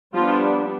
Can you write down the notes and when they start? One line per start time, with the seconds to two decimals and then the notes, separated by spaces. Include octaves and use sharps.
0.15 F3 G3 B3 D4 F4